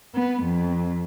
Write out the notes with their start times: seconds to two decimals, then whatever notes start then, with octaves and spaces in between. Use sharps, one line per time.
0.15 B3
0.44 F2